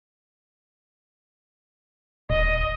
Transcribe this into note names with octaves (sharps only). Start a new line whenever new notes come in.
D#1 D#5